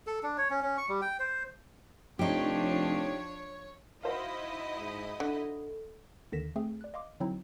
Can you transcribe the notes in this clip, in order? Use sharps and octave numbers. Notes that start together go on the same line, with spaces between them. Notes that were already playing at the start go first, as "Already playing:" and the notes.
A4
D4
C#5
C#4
C#4
C#6
G3
G5
C5
F1 F3 D4 D#4 G4 C#5
D#4 E4 F#4 C5 D#5 F5
G#2
D3 A4
D#2 D3 D#3 A#6 B6 E7
A3 C4 G#4
D5 F#6
D#5 F5 C6 D6
D3 F#3 C4 D#4 E4